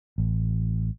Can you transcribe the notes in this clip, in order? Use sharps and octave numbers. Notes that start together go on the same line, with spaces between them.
A1